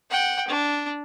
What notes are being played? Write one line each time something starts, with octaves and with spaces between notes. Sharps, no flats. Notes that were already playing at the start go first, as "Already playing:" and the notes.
F#5 G5
D4